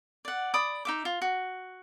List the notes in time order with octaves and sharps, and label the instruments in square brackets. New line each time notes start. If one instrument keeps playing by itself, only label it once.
[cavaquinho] D5 F#5
D5 B5 D#6
D#4 E5 D6
F4
F#4